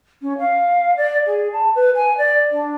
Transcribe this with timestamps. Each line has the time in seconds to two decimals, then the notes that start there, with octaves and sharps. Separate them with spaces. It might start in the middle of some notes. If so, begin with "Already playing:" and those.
0.22 C#4
0.38 F5
0.97 D5
1.27 G#4
1.53 A5
1.75 B4
1.95 G#5
2.18 D5
2.51 D4